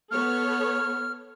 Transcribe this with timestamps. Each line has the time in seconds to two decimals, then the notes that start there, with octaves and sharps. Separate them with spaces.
0.11 B3 A4 C#5 F6